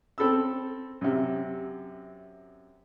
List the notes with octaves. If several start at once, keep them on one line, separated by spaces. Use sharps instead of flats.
C4 A4 B5 E6
F#2 C3